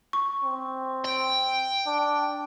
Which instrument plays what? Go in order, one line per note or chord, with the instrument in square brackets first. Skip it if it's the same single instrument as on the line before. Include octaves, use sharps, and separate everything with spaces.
[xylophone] C#6
[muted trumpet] C4
[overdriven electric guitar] G5
[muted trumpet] D4